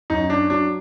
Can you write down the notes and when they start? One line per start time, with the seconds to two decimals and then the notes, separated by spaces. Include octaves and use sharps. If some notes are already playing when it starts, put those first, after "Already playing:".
0.10 F#2 D#4
0.30 D4
0.50 F#3 D4